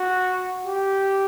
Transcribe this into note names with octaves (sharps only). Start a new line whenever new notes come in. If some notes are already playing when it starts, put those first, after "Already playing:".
Already playing: F#4
G4